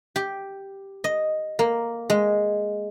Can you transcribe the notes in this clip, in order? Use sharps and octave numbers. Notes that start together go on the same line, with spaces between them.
G4
D#5
A#3
G#3